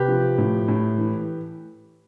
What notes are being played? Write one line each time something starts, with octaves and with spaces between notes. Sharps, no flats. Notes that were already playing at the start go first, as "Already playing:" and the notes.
Already playing: C3 G4 B4
F3
A2
A2
E3